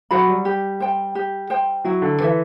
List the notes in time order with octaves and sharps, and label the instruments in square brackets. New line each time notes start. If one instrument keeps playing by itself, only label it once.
[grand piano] F#3 [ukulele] C5 F#5 B5
[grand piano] G3
[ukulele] G4
C5 G5
G4
C5 G5
[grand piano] F#3 [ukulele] E4
[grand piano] D3
[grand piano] E3 [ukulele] A4 C5 E5